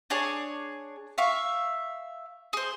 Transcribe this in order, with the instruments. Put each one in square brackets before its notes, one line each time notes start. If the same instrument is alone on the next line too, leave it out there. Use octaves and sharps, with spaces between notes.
[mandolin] D4 G#4 C#5
E5 F5 C#6
G#4 C5